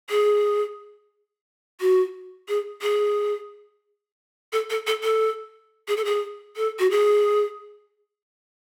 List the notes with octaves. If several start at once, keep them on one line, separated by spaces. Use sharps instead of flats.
G#4
F#4
G#4
G#4
A4
A4
A4
A4
G#4
A4
G#4
A4
F#4
G#4